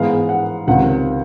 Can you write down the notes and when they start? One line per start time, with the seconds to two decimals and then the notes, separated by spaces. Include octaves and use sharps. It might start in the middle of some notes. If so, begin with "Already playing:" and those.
Already playing: G#2 E3 G#3 B3 F5
0.29 F#5
0.67 C#2 C3 D#3 F#5